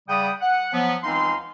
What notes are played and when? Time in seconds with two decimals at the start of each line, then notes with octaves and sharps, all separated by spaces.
0.08 C#3 G3 F#5 G5 B5 D#6
0.41 F#5
0.73 F3 F#3 B3
1.03 C#2 E3 C4 D#4 F5 C6